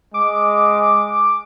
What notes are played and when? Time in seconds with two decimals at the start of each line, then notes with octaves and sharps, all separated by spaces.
0.14 G#3 D6